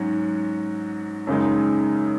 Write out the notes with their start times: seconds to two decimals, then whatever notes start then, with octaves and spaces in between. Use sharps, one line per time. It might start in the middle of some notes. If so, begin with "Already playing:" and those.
Already playing: G#2 F#3 C#4 F#4
1.27 F#2 C#3 G#3 D#4